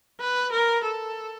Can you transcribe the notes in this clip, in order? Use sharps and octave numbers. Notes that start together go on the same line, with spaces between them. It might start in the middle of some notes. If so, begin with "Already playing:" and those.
B4
A#4
A4